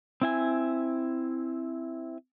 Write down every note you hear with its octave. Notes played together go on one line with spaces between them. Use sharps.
C4 E4 G#5